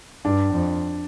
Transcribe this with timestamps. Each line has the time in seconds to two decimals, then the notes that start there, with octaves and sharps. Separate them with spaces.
0.24 G2 D4
0.53 F2